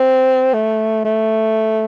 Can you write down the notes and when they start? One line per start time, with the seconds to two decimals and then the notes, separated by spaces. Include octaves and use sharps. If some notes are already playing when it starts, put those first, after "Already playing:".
Already playing: C4
0.53 A3
1.05 A3